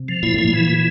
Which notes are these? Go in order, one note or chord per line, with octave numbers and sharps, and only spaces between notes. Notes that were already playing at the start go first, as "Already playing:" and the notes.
Already playing: C3
F3
A#2 E4
A2 E4
A#2
E3
E3